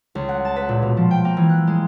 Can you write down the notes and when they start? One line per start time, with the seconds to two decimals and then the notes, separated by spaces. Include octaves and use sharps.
0.15 C#2
0.29 F#5
0.45 A5
0.56 B4
0.69 A#2
0.82 B2
0.97 F3
1.11 G5
1.25 A#3
1.37 E3
1.49 F#6
1.67 G#3